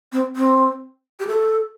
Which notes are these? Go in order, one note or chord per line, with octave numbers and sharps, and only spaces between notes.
C4
C4
G4
A4